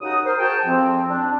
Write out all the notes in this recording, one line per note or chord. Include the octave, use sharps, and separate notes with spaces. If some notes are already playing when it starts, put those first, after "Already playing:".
D#2 C#3 D#4 F#4 F#5 D#6
A#4 C5
F#4 G#4 G5 A5
F2 F3 C4
D4